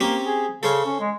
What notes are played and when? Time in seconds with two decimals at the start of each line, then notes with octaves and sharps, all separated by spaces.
0.01 A#3 C4 C#4 G4
0.25 G#4
0.63 C#3 A4 C5 C#5
0.86 C#4
1.00 G#3